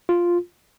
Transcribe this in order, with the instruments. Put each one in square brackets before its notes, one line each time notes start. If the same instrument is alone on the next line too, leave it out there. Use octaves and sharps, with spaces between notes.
[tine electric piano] F4